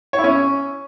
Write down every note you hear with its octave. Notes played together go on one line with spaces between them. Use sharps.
C#5
E4
C#4